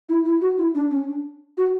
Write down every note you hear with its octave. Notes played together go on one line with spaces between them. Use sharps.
E4
E4
F#4
E4
D4
C#4
D4
F#4